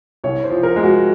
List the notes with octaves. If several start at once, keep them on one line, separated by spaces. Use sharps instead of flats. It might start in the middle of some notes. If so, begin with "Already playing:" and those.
C2 C#5
C5
F3
A#4
G#3
F#4